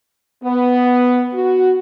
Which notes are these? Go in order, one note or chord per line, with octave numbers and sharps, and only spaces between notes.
B3
F#4